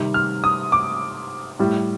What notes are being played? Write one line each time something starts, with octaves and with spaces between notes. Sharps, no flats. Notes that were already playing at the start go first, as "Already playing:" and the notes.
Already playing: C3 D#3 G3
F6
D#6
D6
A2 G3